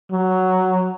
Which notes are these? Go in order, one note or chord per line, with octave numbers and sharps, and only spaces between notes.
F#3